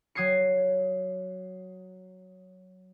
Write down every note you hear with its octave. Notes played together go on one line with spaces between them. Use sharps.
F#3 D#6 G#6 C7 C#7